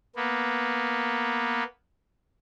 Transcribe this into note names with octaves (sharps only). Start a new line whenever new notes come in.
A#3 B3